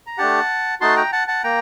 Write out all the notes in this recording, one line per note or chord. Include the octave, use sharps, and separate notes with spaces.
A#5
A3 D4 G4 F#5 A5
A3 D#4 F#4 A5 C6
G5 A#5
F#5 A5
F#5 A5
A#3 G5 A#5